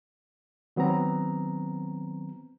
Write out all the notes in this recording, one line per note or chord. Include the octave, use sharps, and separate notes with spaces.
D#3 F#3 B3 C4 A#5